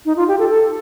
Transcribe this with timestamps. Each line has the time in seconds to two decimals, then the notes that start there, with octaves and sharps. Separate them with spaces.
0.06 D#4
0.16 F4
0.28 G4
0.39 A4
0.49 A4